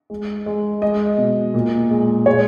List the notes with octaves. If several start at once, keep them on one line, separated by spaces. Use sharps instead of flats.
G#3
G#3
G#3 D#5
B2
A#2
G#3
G#3 C#5